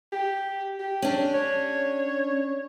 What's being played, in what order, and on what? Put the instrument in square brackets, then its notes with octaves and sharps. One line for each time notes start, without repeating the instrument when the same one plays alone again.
[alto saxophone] G4
G4
[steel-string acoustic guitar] C#4 D4
[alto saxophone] C#5